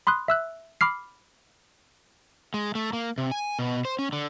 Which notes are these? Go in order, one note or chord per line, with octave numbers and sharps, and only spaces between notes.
B5 C6 D#6 F#6
E5 E6 F#6
B5 D6 F6 C7
G#3
A3
A#3
C3
G#5
B2
C5
C#4
D3